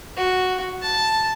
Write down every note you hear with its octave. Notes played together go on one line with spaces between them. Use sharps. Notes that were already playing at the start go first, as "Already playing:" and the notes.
F#4
A5